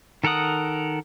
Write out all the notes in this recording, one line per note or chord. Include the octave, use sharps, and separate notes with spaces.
D#3 A4 A#4 F#5 D#6